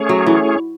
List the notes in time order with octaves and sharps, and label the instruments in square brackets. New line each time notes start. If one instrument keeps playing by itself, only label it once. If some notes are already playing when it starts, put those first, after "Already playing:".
Already playing: [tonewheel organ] A3 C#4 G#4 C#5
[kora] F#3
E3